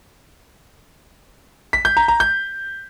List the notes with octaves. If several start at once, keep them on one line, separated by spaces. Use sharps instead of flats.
B6
G6
A#5
A#5
G6